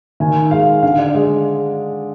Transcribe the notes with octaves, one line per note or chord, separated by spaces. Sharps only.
D#3 G#5
G#3 F5
D3 F5
D5
G#3 D#5